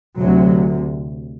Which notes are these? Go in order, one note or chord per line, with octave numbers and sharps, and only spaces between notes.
D2 C3 F#3